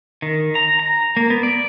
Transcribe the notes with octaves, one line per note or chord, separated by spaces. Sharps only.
D#3
A#5
A#5
A#3
B3
D5